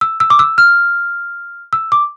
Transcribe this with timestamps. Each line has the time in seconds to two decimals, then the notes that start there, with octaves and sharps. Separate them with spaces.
0.01 E6
0.20 E6
0.30 D6
0.39 E6
0.58 F6
1.73 E6
1.92 D6